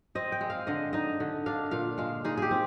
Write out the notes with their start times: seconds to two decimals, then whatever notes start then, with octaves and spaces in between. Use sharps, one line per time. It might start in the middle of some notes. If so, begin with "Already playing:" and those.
0.15 C4 D#5
0.32 G5
0.41 G#3
0.50 F5
0.67 D3 D#5
0.93 D#4 D#5
1.20 D3
1.46 D4 F5
1.71 A#2 F5
1.98 G#3 F5
2.24 D#4 G#4
2.37 G4 G#4
2.51 C4